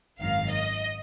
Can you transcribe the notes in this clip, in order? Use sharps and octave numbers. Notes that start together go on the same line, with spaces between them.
G#1 F#2 D#3 F5
D#5